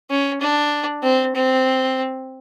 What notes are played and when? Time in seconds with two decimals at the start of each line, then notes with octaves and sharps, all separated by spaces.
0.10 C#4
0.41 D4
1.03 C4
1.35 C4